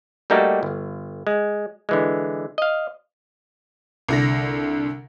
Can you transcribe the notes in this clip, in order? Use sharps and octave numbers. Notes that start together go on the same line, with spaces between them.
G3 A3 A#3 D#4 F#4 G4
G1
G#3
D3 E3 G#3
D#5 F5
C2 D3 A#6